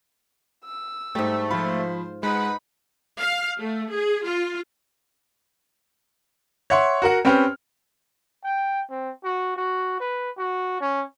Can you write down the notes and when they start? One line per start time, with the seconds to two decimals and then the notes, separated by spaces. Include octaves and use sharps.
0.65 E6
1.15 G#2 G3 A3
1.51 F3 F4 C5 B5
2.23 G#3 D#4 B4 F#5 B5
3.18 F5
3.59 A3
3.91 G#4
4.24 F4
6.70 C#5 E5 F#5 C6 C#6
7.02 F#4 A#4 F#5
7.25 C4 C#4 G4 B4 G5 F6
8.44 G5
8.90 C4
9.24 F#4
9.56 F#4
10.00 B4
10.38 F#4
10.81 C#4